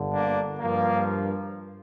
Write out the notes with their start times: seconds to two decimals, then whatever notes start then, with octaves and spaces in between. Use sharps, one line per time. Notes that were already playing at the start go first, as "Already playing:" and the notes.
Already playing: G1 G2 D3
0.12 A#3 D4
0.59 G2 F3 A#3